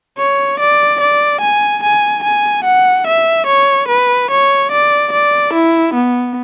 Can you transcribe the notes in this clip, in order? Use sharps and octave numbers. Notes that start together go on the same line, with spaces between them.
C#5
D5
D5
G#5
G#5
G#5
F#5
E5
C#5
B4
C#5
D5
D5
E4
B3